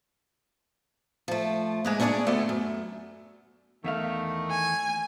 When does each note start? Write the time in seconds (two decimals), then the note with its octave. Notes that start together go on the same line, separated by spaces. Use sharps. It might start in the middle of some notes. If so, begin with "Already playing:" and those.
1.28 F3 A3
1.85 G#3 A#3 B4
2.00 C#4 D4 E4 F#4 G#4 D5
2.26 D2 A3 B3
2.49 F#2
3.84 E2 D#3 A3 E5 F5
4.50 G#5